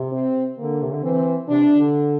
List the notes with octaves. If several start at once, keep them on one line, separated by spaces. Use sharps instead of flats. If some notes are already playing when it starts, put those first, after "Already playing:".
Already playing: C3
C4
D3 A#3
C3
D3
E3 C4
C3 D4
D3